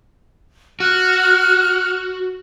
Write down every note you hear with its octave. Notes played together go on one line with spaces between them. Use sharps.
F#4 F6 F#6